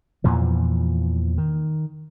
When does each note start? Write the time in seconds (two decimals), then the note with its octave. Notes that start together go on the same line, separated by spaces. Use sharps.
0.24 E2 A#2 E3 F3
1.38 D#3